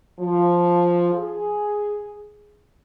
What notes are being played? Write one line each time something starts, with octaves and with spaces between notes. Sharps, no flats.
F3
G#4